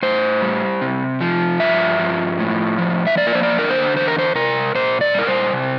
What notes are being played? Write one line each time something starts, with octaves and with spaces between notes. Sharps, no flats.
A2 C5
G3
C3
F3
G2 E5
F3
A2
F3
E5
A#3 D5
A#4
C5
D5
D3 A#4
C5
E2 C5
A#4
C5
C3 A#4
A#2 C5
D5
G3 A#4
C5
C3